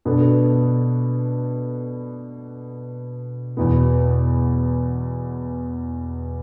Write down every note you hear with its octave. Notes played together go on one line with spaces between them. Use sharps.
B2 B3 D4 A4
E2 B2 B3